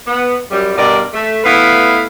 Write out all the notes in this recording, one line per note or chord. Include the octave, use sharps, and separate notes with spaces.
B3
F#2 G3
G2 B2 A#4 D5
A3
A3 B3 E4 B4 F5